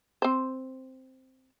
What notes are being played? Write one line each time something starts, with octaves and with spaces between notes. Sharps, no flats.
C4 C5